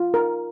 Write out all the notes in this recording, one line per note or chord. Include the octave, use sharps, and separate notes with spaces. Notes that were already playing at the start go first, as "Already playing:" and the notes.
Already playing: F4
A#4